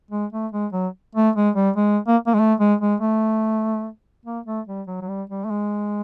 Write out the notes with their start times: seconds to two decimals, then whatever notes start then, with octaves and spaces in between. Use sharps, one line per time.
0.11 G#3
0.32 A3
0.52 G#3
0.73 F#3
1.15 A3
1.36 G#3
1.56 G3
1.76 G#3
2.08 A#3
2.27 A#3
2.34 G#3
2.40 A3
2.60 G#3
2.81 G#3
3.01 A3
4.25 A#3
4.46 A3
4.68 G3
4.87 F#3
5.01 F#3
5.08 G3
5.30 G3
5.45 A3
5.50 G#3